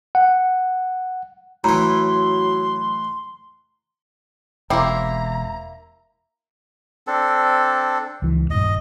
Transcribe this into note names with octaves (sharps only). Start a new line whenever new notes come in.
F#5
A2 E3 F#3 A#5 C6
E1 A#3 C4 E4 G4 C5 A#5
C4 D4 A4
C#2 E3
D#1 G2 D#5